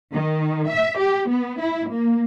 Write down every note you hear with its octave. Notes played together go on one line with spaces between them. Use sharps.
D#3
E5
G4
B3
E4
A#3